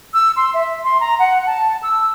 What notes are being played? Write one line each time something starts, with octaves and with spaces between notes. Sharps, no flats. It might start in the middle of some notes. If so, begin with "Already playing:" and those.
E6
C6
E5
C6
A#5
F#5
A5
E6